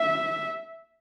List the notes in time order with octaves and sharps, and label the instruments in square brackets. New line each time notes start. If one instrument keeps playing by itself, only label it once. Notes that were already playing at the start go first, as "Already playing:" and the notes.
Already playing: [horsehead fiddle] E5